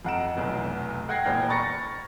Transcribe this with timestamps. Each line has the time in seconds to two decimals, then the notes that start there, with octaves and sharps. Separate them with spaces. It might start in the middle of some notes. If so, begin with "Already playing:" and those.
0.05 F2 D#5 F#5 A#5 D7 E7
0.37 F1 B1 E2
1.09 F#5 G5 F#6 G#6 A#6 C7
1.25 D#1 A#1 E2 C5 G5 F6
1.48 A#5 B5 C#6 A6 A#6 C#7